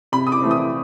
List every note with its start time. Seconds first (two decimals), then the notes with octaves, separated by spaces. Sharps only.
0.12 C3 B5
0.27 D#6
0.32 D6
0.42 E3 A3 C4
0.51 D#6